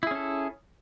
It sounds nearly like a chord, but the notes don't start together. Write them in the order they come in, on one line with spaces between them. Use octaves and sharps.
E4 G#4 C#4 A4